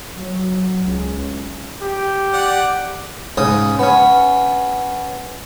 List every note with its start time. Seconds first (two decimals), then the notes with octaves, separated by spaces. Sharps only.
0.15 F#3
0.81 C#2
1.82 G4
2.33 D5 F#5
3.37 G#2 C#3 D#6
3.79 B3 C#4